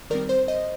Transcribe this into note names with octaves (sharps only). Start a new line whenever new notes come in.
D#3 G3 C4 A#4 D5
C5
C5 D#5